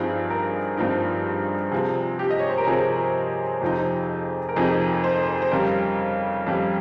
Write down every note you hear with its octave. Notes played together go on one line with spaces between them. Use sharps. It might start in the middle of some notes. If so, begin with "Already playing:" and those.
Already playing: G2 F3 C4 D#4 G#4
A#4
G2 F3 C4 D#4
C3 F3 C4 G#4
G4
D#5
C#5
C5
A#4
C3 F3 C4 G#4
F2 C3 F3 C4 D#4
A#4
F2 C3 F3 C4 D#4 G#4
C5
C5
F2 C#3 G3 A#4
F2 C#3 G3